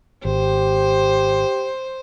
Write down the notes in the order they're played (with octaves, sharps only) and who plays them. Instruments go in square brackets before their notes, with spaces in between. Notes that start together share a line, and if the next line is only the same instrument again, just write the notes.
[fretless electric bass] G#1 [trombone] G4 [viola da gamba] C5